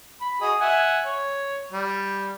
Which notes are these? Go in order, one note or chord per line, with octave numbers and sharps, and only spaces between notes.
B5
F#4 G#4 D#5
E5 F#5 G#5
C#5
G3